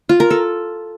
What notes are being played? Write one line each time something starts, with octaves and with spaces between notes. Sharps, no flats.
F4
A#4
A4